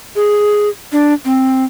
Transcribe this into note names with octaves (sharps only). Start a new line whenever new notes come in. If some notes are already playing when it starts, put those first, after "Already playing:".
G#4
D4
C4